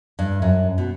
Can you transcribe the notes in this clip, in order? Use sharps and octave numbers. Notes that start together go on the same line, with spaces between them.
G2
F#2
B2